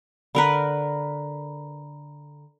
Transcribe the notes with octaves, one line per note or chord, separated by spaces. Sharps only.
D3 A#4 B4 A#5 B5